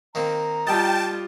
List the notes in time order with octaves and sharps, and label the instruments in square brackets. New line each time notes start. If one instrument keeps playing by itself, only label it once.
[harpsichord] D#3 A#3 C4 [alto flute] A#5
[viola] G3 F4 [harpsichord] D#5 [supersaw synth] G5 A5